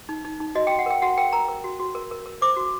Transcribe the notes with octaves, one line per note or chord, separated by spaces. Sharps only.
D#4
D#4
D#4
F#4 D#5
F#4 G5
F#5
A#4 G5
F#4 F#5
A#4 G5
A#4 A#5
A#4
F#4
F#4
A#4
A#4
A#4
C5 D6
F#4